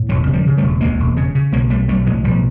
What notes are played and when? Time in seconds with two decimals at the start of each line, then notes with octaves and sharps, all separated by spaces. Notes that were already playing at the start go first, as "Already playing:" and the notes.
Already playing: A2
0.09 E1 E3 F#3
0.27 C#3
0.33 F3 G3
0.46 C#3
0.57 G3 A3
0.64 E1
0.81 D2 G#3 A#3
1.00 E1
1.17 C#3
1.35 C#3
1.52 B1 G#3 A#3
1.70 B1 G3 A3
1.88 B1 G3 A3
2.06 A2 F#3 G#3
2.24 B1 F3 G3